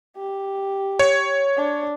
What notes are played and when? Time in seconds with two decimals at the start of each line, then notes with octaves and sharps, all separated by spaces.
0.17 G4
0.99 C#5
1.57 D4